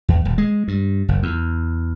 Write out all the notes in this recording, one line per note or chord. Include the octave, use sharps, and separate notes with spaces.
E2
D#1
G#3
G2
F#1
E2